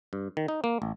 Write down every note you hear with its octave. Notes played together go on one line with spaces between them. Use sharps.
G2
D#3
D#4
A#3
A1